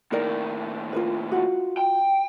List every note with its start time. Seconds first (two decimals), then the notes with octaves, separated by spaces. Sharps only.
0.12 D#2 A2 D#4 A#4 D5
0.93 F4 A#4 B4
1.32 F4 F#4
1.77 G5